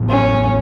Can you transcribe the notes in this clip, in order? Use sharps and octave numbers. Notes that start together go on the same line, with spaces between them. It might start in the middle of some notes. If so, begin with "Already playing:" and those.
Already playing: A1 A2 F#3 B3
C#4